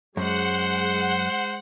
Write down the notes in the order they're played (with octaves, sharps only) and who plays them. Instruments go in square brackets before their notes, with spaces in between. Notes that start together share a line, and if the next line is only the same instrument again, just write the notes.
[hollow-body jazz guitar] F#2 [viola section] G#3 [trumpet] C5 [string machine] F#5